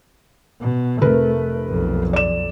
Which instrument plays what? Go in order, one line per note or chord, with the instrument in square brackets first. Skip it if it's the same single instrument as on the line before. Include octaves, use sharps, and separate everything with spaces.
[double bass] B2
[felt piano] F1 A#4 B4 [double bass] A3
[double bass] B1 F2
[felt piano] D5 E7